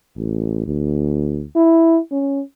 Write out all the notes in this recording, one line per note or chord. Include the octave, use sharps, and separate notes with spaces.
A1
D2
E4
C#4